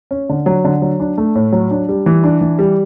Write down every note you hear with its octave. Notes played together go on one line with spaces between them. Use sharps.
C#4
D3
F#3
D3
F#3
D4
A3
A2
F#3
D4
G3
E3
D4
E3
G3